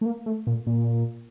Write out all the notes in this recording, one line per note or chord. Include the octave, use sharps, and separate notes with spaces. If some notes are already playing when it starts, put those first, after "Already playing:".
A3
A#3
A3
A#2
A#2